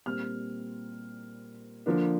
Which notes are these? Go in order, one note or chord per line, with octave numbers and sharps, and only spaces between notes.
A#2 G3 C4 F6
D3 F3 A#3 D4